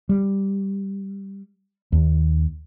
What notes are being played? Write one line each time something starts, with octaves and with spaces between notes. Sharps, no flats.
G3
D#2